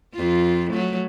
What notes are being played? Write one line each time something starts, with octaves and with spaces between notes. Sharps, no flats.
F2 F4
F#3 A3